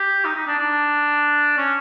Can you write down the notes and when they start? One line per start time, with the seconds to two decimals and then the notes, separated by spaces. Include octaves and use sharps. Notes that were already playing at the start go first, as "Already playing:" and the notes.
Already playing: G4
0.24 D#4
0.36 D#4
0.47 D4
0.58 D4
1.57 C#4